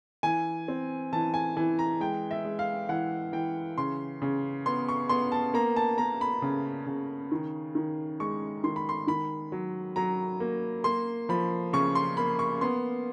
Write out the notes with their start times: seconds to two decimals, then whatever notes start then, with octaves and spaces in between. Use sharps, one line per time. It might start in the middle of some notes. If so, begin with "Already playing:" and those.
0.23 E3 G#5
0.68 C4
1.13 E3 A5
1.34 G#5
1.57 E3 G#5
1.79 A#5
2.00 G#3 G5
2.31 E5
2.45 G#3
2.59 F5
2.89 E3 F#5
3.33 E3 G5
3.78 C#3 C6
4.22 C#3
4.66 B3 C6
4.89 C#6
5.09 B3 C6
5.32 A5
5.54 A#3 A#5
5.76 A5
5.98 A#3 A#5
6.21 B5
6.42 C#3
6.87 C#3
7.32 D#3
7.75 D#3
8.20 G#3 C#6
8.64 D#3 C6
8.76 B5
8.89 C6
9.07 D#3 B5
9.52 F#3
9.96 F#3 A#5
10.40 A#3
10.84 A#3 C6
11.29 F3 B5
11.73 C#3 C#6
11.95 C6
12.17 A#3 B5
12.39 C#6
12.61 B3 C6